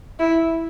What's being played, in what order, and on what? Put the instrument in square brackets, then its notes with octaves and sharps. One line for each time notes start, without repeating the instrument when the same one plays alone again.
[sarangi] E4